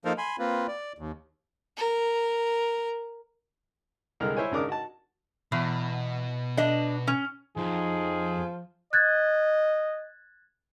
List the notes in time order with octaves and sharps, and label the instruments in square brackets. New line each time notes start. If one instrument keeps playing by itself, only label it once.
[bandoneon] F3 A#3 D#4 A4 A#4 C5
G#5 B5 C6
A#3 C4 F4 B4
D5
D#2
[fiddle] A#4
[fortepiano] C2 D3 G#3 A#4 F6
E4 C5 C#5 G#5
G#1 C#3 D4 A#4 D6 D#6
F#4 A5
[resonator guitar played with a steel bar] E2 [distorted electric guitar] B2
[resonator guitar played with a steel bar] D4 D#5
C#4
[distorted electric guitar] F2 [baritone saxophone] F3 [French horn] D#4 [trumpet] G#4
[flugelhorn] D#5 [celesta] F#6 G#6 A6